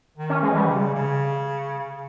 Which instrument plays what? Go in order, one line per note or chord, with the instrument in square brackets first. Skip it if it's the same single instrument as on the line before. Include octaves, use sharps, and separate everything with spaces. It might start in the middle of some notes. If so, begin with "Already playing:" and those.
[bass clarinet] D#3
[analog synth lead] C#4
[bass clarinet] E3 [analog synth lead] G#3
[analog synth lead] G3
[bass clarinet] C#3
C#3